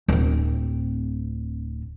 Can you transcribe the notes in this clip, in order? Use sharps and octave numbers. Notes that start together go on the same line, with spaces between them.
D1 C4